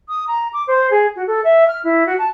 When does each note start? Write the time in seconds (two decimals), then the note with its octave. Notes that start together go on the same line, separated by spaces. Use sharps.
0.09 D#6
0.28 A#5
0.53 D6
0.67 C5
0.91 G#4
1.16 F#4
1.27 A4
1.44 E5
1.68 F6
1.84 E4
2.06 F#4
2.18 A5